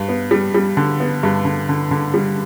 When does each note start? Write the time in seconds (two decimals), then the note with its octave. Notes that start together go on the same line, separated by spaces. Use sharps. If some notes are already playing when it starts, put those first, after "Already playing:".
Already playing: G2
0.09 B3
0.31 G3
0.55 G3
0.77 D3
1.00 B3
1.23 G2
1.45 D3
1.69 D3
1.91 D3
2.14 G3